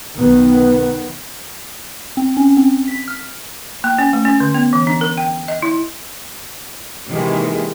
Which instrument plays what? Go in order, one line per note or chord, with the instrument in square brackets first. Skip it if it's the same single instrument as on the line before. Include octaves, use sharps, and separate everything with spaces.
[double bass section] B1 D#3 B3
[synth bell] C4
C#4
C4
B6
F6
[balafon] A#3
C#4
A3
C#4
D3
B3
E3
D4
A#4
G5
D#5
E4
[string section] C3 D#3 E3 G#3 A#3